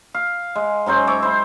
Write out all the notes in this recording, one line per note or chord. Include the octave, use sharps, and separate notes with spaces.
F5
G#3
G#2 F#3 C#4 C5
C#5 E5 D6
E4 C5